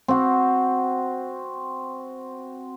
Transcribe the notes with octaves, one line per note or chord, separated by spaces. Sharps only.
C4 F#4